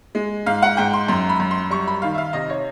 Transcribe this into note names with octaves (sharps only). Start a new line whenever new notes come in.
G#3
G#2 F5
F#5
G#2 G5
C6
F#2 C6
B5
F#2
C6
G3 C#6
B5
D#3 F5
E5
F5
C3 D#5
C#5